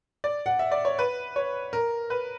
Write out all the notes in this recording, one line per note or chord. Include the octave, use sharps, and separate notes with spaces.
D5
F#5
E5
D5
C#5
B4
C#5
A#4
B4